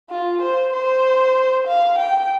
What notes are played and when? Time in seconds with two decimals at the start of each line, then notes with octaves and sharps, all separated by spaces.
0.10 F4
0.42 C5
0.73 C5
1.67 F5
1.98 G5